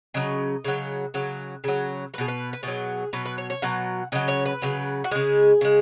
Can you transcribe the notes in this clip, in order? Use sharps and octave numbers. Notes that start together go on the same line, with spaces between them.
C#3 F#3 D#5
C#3 F#3
C#3 F#3
C#3 F#3
F#3 B4
B2 G#4
B4
B4
B2 F#3 G#4
B2 F#3 B4
B4
C#5
C#5
B2 F#3 F#5
C#3 F#3 D#5
C#5
B4
C#3 F#3
F#4
C#3 G#3 G#4
C#3 G#3